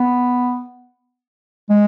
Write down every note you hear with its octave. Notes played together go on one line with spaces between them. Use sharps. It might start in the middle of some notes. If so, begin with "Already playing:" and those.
Already playing: B3
G#3